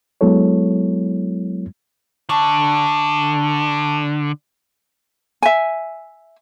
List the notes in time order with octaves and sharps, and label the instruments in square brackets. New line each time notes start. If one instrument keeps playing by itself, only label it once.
[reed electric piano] F#3 G#3 B3 E4 A4 C#5
[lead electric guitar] D3 [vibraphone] A5 C#6
[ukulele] E5 G#5